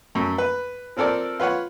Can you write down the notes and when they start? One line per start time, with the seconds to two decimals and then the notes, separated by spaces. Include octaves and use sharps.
0.15 F#2 A3
0.38 B4
0.97 F3 C4 A4 A#4 D5
1.40 F4 B4 C#5 F#5